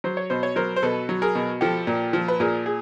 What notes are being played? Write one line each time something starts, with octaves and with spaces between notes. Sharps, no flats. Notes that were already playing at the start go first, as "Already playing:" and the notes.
F#3 C5
C#5
B2 C5
C#5
F#3 A#4 C5
C5
B2 A4 B4
F#3
G#4 A#4
B2
F3 G4 A4
A#2
F3
B4
A#2 G#4 A#4
G#4